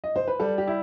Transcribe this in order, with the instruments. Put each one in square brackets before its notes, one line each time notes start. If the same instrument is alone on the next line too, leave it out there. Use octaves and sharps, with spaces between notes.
[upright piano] D#5
C5
B4
[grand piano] G3 [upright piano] A4
[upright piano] G4
[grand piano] E4